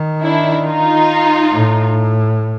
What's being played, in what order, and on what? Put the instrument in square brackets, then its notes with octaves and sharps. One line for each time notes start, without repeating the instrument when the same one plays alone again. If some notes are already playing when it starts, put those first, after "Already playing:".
Already playing: [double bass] D#3
[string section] D4 E4
D#4 F4
[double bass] A2